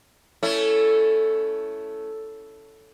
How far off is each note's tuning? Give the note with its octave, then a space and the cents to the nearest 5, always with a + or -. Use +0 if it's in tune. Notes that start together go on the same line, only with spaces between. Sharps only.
A3 +0 C#4 +20 E4 +5